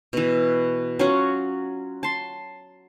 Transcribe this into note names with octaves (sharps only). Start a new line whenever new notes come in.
B2 E3
F#3 C#4 F4 F#4
A5 C6